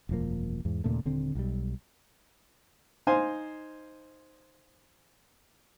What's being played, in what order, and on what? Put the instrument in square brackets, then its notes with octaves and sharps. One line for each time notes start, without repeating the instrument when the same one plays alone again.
[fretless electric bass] E1 F#2 F3 A#3
E2 G#2
D#2 A#2 C#3 A3
D#1 D3 C4
B1 G3
[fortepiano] D#4 C5 F5 G#5 C6